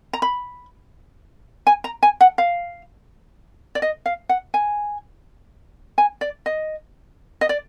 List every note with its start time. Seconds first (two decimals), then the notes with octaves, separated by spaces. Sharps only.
0.13 A#5
0.22 B5
1.67 G#5
1.84 A#5
2.03 G#5
2.21 F#5
2.38 F5
3.75 D5
3.82 D#5
4.06 F5
4.29 F#5
4.54 G#5
5.98 G#5
6.21 D5
6.46 D#5
7.41 D#5
7.49 D5